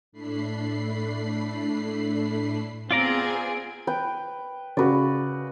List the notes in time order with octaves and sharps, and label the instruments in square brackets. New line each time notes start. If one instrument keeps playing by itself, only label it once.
[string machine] A2 A3 D4 B5 C7
[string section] B3 C4 G#4 [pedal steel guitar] F4 D5 A#5
[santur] B4 G5
[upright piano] C#3 F#4 [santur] B4 D5